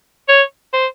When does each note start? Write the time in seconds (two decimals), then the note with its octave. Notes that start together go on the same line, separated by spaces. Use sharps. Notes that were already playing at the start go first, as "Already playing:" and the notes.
0.29 C#5
0.73 C5